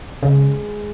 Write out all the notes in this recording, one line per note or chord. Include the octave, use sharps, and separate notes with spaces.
C#3 G#3